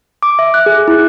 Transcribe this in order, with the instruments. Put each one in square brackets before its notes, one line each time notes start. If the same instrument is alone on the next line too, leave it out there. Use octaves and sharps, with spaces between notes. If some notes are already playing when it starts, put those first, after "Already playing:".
[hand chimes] D6
E5
F#6
G#4
E4